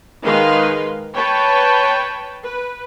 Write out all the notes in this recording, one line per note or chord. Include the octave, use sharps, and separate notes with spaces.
D#3 G#3 G#4 B4 F5 C6
B4 C#5 G5 A5 B5
B4